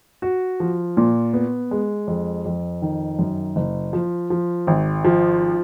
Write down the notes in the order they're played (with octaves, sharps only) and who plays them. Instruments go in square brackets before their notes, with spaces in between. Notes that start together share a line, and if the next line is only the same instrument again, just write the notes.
[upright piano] F#4
F3
A#2
B3
G#3
F2
F2
D#3
F#2
F#1
F3
F3
G#1
F3